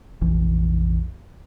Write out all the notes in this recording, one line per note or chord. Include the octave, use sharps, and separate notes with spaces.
F1 A#1 E3